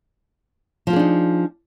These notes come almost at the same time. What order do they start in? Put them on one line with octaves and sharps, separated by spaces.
F3 F4 G#4 D4 D#4